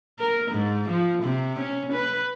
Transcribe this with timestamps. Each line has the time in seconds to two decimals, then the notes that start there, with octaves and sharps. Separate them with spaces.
0.19 A#4
0.52 G#2
0.89 F3
1.23 C3
1.59 C#4
1.93 B4